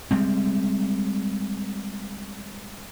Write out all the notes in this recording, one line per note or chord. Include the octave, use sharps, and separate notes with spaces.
G3 G#3 C4